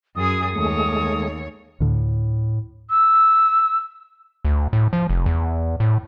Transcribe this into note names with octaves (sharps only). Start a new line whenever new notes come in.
F#2 G#4 D#6
D#2 G#3 A3 C#5
D2 A2 D3
E6
D2
A2
F3
F1
E2
A2